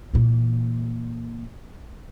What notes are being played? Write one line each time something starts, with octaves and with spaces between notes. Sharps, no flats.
A#2 E3